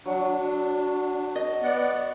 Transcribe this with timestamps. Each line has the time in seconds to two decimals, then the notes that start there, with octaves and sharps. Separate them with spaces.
0.06 F#3 D4
1.36 D#5
1.63 B3 D5 F#5